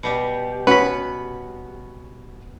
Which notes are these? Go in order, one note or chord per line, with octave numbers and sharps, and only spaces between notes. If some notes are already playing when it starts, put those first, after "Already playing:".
B2 G3 G4
B3 C#4 F#4 B4 B5